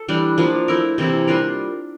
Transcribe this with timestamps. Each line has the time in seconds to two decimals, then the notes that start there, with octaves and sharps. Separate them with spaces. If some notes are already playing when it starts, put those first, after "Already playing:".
Already playing: A4
0.08 E3 G3 D4
0.38 F3 A#3 D4 F4
0.68 A3 E4 A#4
0.98 C3 E3 A#3 E4
1.27 G3 D4 F4 A#4